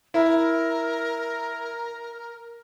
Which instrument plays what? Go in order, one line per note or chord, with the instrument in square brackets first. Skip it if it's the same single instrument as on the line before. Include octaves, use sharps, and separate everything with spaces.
[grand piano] E4 [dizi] A#4